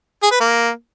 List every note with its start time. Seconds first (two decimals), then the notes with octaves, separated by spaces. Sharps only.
0.23 G#4
0.32 B4
0.40 A#3